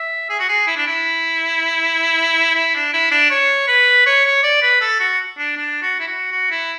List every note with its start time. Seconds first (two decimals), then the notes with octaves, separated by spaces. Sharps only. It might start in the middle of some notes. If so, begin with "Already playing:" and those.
Already playing: E5
0.30 G#4
0.39 F#4
0.48 G#4
0.67 E4
0.76 D4
0.87 E4
2.55 E4
2.75 D4
2.93 E4
3.11 D4
3.30 C#5
3.68 B4
4.06 C#5
4.25 C#5
4.43 D5
4.62 B4
4.81 A4
5.00 F#4
5.38 D4
5.57 D4
5.82 F#4
6.00 E4
6.07 F#4
6.32 F#4
6.51 E4